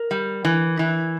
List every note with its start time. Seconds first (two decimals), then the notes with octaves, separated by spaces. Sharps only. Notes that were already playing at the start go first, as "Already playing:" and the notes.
Already playing: A#4
0.11 G3
0.45 E3
0.79 E3